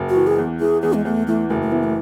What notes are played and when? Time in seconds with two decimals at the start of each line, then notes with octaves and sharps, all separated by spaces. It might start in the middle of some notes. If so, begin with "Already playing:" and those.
Already playing: F#1
0.09 F#4
0.16 E3
0.27 G#4
0.38 E2
0.60 E3 G#4
0.82 E2 G#4
0.94 G#3
1.05 E2 A3
1.27 E3 A3
1.49 F#1 A3
1.62 A3
1.72 E3 B3
1.83 A3